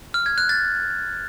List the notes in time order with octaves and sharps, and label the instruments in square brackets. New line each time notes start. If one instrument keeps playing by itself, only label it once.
[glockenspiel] F6
G#6
F#6
A6